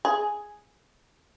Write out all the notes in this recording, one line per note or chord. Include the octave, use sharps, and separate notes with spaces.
G#4